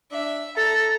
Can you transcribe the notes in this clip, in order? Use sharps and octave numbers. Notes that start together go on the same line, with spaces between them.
D4 E5
A4 A#5 A6